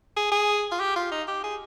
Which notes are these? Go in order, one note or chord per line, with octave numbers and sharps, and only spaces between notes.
G#4
G#4
F4
G4
F4
D#4
G4
G#4